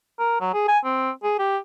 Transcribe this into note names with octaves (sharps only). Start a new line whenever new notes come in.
A#4
F#3
G#4
G#5
C4
G#4
G4